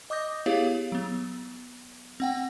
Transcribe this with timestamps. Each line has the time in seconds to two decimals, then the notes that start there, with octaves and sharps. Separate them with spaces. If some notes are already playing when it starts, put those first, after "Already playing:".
0.10 D#5 D6 D#6 G6 A#6
0.46 B3 E4 G4 G#4 C#5 F5
0.92 F#3 B3
2.20 C4 F#5 G5